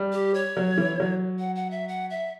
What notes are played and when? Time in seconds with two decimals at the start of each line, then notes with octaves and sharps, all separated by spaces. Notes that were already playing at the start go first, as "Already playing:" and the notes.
Already playing: G3
0.12 G4
0.34 C#5
0.57 F#3
0.78 E3
1.00 F#3
1.39 F#5
1.55 F#5
1.71 E5
1.88 F#5
2.10 E5